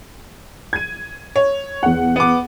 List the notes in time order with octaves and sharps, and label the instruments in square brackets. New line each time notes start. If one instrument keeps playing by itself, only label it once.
[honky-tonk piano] G#6 D#7
[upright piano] C#5
[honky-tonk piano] E2 F#5
[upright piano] B3 D6